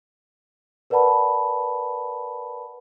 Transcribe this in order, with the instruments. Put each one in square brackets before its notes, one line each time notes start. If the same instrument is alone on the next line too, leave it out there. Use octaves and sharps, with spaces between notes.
[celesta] A#4 B4 D5 F#5 A5 B5